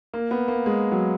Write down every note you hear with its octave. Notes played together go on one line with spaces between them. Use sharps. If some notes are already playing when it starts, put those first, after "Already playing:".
A#3
B3
A#3
G#3
F#3